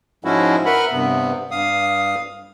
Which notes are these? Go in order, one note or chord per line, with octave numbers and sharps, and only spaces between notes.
G#2 F3 G#3 C#4 E4 F#4
A#4 B4 E5 F#5 B5
G2 C3 B3
G2 F5 D#6